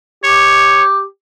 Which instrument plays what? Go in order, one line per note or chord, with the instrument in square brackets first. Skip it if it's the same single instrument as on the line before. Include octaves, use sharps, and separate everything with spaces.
[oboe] G4 [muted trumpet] C#5